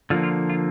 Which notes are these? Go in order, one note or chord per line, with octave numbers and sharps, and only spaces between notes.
D3 F3 A#3 F4
F4
F4